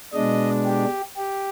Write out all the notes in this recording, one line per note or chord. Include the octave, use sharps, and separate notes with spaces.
B2 G#3 D4 D#5
G4
G4